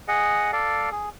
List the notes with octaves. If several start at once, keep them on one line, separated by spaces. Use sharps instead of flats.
G#4 D#5 F#5
A4 D5 F5
G#4